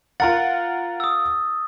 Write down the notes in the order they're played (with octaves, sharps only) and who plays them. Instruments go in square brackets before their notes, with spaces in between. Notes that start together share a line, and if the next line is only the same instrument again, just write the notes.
[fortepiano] F4 A#4 F#5 [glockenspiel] A6
[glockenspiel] D#6 E6